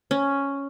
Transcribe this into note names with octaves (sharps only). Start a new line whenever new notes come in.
C#4